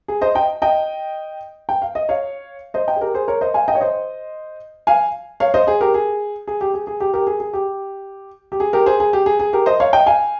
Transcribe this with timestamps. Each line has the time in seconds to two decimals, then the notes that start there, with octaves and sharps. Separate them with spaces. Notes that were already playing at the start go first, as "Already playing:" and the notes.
0.08 G#4
0.21 C5 D#5
0.35 D#5 G5
0.62 D#5 G5
1.69 G5
1.82 F5
1.95 D#5
2.09 C#5 F5
2.74 C5 D#5
2.88 D#5 G5
2.96 G#4
3.01 G4 A#4
3.14 G#4 C5
3.28 A#4 C#5
3.41 C5 D#5
3.54 F5 G#5
3.68 D#5 G5
3.75 C#5
3.81 C5 D#5
4.87 F5 G#5
5.40 C#5 F5
5.54 C5 D#5
5.67 G#4 C5
5.81 G4 A#4
5.94 G#4
6.47 G#4
6.61 G4
6.74 G#4
6.87 G#4
7.00 G4
7.13 G4 A#4
7.27 G#4
7.40 G#4
7.53 G4
8.52 G4
8.60 G#4
8.73 G4 A#4
8.86 G#4 C5
9.00 G#4
9.13 G4
9.26 G#4
9.39 G#4
9.53 G4 A#4
9.66 C5 D#5
9.80 C#5 F5
9.93 D#5 G5
10.06 F5 G#5